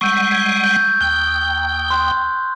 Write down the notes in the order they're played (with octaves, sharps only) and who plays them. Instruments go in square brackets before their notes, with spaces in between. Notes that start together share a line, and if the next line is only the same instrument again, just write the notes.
[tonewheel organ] G3 G#3 F#5 [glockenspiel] C#6 E6 G6
[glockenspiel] G#6
G6
[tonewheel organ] D#2 G5 [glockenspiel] F#6
[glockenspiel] C6 F#6